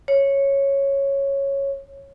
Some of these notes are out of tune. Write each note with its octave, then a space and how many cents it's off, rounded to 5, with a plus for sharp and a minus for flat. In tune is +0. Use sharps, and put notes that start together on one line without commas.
C#5 -5